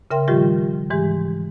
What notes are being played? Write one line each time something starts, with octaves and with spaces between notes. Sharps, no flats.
C#3 A#4 E5 G5 C6
A2 D#3 F3 G3 F4 G4
G#2 E3 G#3 G4